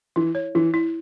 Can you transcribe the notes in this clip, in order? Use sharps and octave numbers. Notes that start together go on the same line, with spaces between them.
E3 E4
C#5
E3 E4
E4